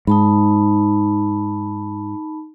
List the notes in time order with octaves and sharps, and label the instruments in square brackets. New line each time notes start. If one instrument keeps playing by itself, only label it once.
[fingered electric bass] G#2 [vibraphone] D#4 A5 B5